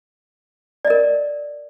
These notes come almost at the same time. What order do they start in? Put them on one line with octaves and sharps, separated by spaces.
D5 D#5 A#4